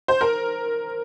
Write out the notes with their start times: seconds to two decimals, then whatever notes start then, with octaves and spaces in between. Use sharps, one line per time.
0.08 C5
0.21 A#4